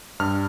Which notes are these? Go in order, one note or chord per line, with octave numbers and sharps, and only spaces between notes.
G2 F6